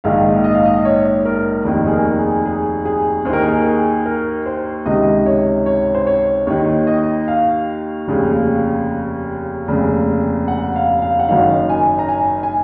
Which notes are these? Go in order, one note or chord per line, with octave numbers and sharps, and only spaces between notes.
A#1 G#2 D#3 F5
D#5
F5
D#5
C#5
A#4
F1 D#2 D#3
G#4
A#4
G#4
G#4
G#4
D#2 D#3 A#4 C5
G#4
A#4
G#4
A#4
C5
C#2 C3 D#3 D#5
C#5
C#5
C5
C#5
D#2 D#3 C#5
D#5
F5
F1 D#2 C#3
F1 D#2 C#3
F#5
F5
F5
F#5
F#1 F#2 D#3 F5
G#5
A#5
G#5
G#5